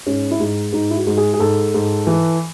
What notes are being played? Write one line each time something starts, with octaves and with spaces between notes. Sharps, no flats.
G#2 C#4
E4
G#2 D#4
G#2 D#4
E4
F#4
G#2
G#4
G#4
G#2 A4
G#2
E3